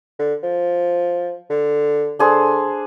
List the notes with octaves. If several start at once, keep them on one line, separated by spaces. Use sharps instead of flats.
D3
F3
D3
D3 D4 G#4 C5